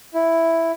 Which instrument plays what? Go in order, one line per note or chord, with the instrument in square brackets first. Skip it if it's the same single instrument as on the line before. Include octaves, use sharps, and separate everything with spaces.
[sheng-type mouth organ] E4